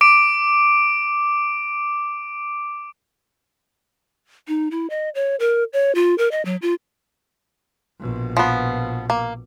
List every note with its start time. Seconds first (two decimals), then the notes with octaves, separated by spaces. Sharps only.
0.01 D6 D7
4.48 D#4
4.71 E4
4.90 D#5
5.15 C#5
5.40 A#4
5.73 C#5
5.95 F4
6.18 A#4
6.31 D#5
6.45 F#3
6.62 F4
8.00 A#1 B2
8.37 F3 B3
9.10 A#3